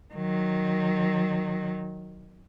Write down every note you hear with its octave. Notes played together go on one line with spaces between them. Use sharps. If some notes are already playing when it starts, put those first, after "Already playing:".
D#3 F#3